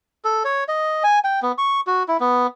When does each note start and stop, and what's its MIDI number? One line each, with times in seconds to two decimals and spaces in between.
0.25 0.43 69
0.44 0.64 73
0.68 1.03 75
1.04 1.19 80
1.24 1.40 79
1.42 1.52 59
1.58 1.80 85
1.87 2.03 66
2.08 2.17 64
2.20 2.47 59